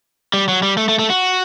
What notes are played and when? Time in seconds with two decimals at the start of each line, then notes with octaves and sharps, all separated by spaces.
0.34 G3
0.48 F#3
0.63 G3
0.77 A3
0.89 A3
0.99 A3
1.10 F#4